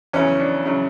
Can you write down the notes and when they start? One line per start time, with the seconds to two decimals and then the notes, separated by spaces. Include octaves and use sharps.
0.13 E2 C#3 F#3 C#4
0.40 D4
0.65 C#3 F#3